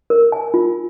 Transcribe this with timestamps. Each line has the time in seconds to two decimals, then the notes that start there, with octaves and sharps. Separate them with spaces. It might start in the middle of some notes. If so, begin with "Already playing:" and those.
0.10 A#4
0.32 G#5
0.54 F4